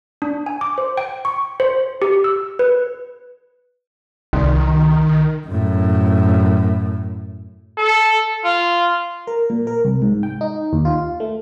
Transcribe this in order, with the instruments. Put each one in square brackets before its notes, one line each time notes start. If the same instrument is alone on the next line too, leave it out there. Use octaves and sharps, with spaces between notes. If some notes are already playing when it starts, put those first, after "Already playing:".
[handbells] D4
G#5
D6
C5
G5
C#6
C5
G4
E6
B4
[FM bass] C2 [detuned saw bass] D#3
[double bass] F#2 A2
[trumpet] A4
F4
[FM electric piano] A#4
A#2
A#4
C2
G#2
G5
D#4
D#2
F4
A3